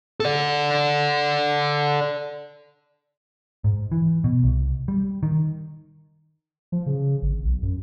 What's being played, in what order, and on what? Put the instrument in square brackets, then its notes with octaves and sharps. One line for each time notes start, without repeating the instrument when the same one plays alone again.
[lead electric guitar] A4 D5
[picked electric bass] G#2
E3
B2
C2
G3
D#3
[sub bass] F3
C#3
G#1
B1
F#2